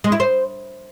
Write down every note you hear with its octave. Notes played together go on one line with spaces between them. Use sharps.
G#3
E4
C5